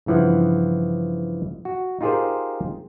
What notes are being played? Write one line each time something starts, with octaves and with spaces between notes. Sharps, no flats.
G2 C#3 E3 F3 F#5
F#4
D#4 F4 G4 G#4 A#4 C5